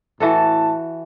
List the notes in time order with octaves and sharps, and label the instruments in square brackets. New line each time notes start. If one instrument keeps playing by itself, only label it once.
[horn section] A2 A5 [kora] E3 F#4 A4